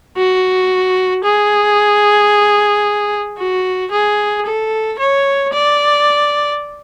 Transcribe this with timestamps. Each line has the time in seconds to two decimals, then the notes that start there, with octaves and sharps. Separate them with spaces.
0.17 F#4
1.24 G#4
3.38 F#4
3.92 G#4
4.46 A4
4.99 C#5
5.53 D5